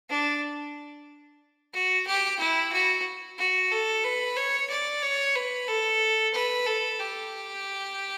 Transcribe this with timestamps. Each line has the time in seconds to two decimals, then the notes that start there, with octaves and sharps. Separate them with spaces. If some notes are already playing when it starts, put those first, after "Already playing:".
0.10 D4
1.73 F#4
2.07 G4
2.39 E4
2.72 F#4
3.38 F#4
3.71 A4
4.04 B4
4.36 C#5
4.70 D5
5.03 C#5
5.36 B4
5.68 A4
6.34 B4
6.67 A4
7.00 G4